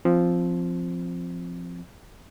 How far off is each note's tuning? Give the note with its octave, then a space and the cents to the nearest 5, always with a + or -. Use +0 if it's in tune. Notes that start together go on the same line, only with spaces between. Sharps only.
F3 +0 C4 +0